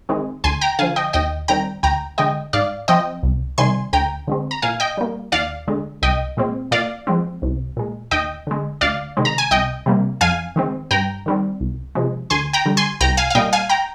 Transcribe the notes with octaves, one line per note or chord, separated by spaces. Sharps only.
D#3 G#3 C4
D2 G#5 C6
G5 A#5
D3 F3 F5 G#5
D#5 G5
D#2 D#5 G5
D#3 G3 C4 G5 A#5
D2 G5 A#5
D3 G#3 D#5 G5
G#2 D5 F5
F3 C4 D#5 G5
C2
C3 D#3 G3 G#5 C6
D2 G5 A#5
D3 G#3 C4
A#5
A#2 F5 G#5
D#5 G5
G3 A#3
D#2 D5 F5
D3 G#3
C2 D#5 G5
A#2 G#3 C4
A#2 D5 F5
F3 G#3 C4
C2
A#2 G#3
D#2 D#5 G5
D3 G#3
D2 D5 F5
C3 D#3 G#3 C4
A#5
G#5
C2 D#5 G5
C3 G3 A#3
F2 F5 G#5
D#3 G#3 C4
G2 G5 A#5
D#3 G3 C4
C2
C3 F3 G#3
D2 G#5 C6
G5 A#5
D3 G3
G#5 C6
C2 G5 A#5
F5 G#5
F5
A#2 G3 A#3 D#5 G5
F5 G#5
G5 A#5